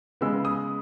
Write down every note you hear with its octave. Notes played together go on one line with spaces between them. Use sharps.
C#3 G#3 B3 E6
D#6